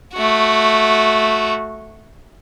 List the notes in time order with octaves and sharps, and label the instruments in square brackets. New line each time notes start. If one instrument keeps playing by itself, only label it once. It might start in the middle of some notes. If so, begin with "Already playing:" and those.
[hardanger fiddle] A3 F#4